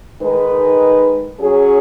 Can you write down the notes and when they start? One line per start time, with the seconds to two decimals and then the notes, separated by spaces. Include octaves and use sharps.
0.21 D#3 G#3 D#4 B4
1.41 F#3 C#4 G#4